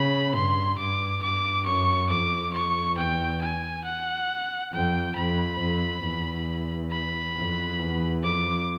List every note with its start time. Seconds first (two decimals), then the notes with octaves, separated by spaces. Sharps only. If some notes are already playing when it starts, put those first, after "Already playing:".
Already playing: C#3 B5
0.35 G2 C6
0.78 G2 D6
1.23 G2 D6
1.66 F#2 C#6
2.10 F2 D6
2.54 C#6
2.97 E2 G5
3.41 G#5
3.84 F#5
4.73 F2 G5
5.16 F2 B5
5.60 F2
6.04 E2
6.91 B5
7.36 F2
7.79 E2
8.23 F2 D6